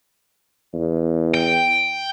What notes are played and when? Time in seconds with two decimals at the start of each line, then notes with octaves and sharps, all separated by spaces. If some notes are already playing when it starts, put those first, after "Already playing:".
0.74 E2
1.34 G5